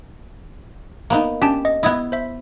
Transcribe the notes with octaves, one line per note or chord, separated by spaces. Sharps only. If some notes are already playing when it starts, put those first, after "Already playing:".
A#3 B3 D#4
C#4 D4 G4 A5
D#5
B3 E4 D#5 D#6 G#6
C5 E5